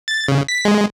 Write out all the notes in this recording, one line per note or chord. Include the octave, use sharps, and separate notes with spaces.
A6
C#3
B6
G#3